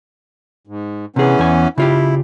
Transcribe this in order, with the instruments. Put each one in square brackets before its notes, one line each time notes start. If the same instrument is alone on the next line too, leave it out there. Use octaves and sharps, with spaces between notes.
[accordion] G#2
[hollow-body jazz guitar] C3 G#4 [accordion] E3 B3 C#4
[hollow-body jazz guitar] E2 G#5
[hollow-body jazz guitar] C#3 F4 G4 [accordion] E4